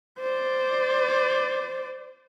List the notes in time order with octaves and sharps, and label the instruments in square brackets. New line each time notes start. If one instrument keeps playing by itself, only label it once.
[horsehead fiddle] C5 D5